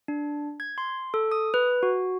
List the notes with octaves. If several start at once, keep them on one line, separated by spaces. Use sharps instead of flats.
D4
G#6
C6
A4
D#6
B4
F#4